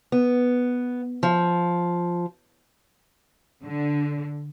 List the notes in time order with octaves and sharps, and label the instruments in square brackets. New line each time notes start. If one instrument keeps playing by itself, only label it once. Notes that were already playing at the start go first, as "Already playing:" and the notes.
[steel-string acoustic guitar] B3
F3
[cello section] D3